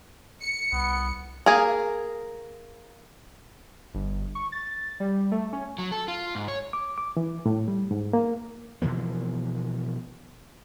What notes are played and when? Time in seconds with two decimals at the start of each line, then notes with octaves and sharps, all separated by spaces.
0.42 C#7
0.73 C2 B3
1.46 A#3 G#4 A#4
3.94 G1
4.35 C#6
4.52 A6
5.00 G3
5.32 A3
5.53 C#4
5.78 F#3
5.92 A4
6.08 F4
6.35 G#2
6.48 C#5
6.73 D6
6.98 D6
7.17 E3
7.46 A2
7.68 G3
7.91 G#2
8.13 A#3
8.82 B2 E3 F3 A#3